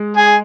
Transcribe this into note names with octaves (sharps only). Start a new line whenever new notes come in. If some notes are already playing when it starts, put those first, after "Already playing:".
Already playing: G#3
G#4 G#5